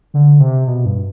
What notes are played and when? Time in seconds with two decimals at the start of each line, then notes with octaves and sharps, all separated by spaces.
0.14 D3
0.40 C3
0.67 B2
0.85 G2